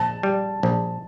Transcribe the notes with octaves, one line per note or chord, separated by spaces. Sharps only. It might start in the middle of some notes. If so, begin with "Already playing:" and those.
Already playing: A#1 A5
G3
A#1